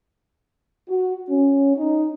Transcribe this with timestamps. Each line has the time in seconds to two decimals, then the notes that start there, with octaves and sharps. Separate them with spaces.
0.89 F#4
1.29 C#4
1.77 D#4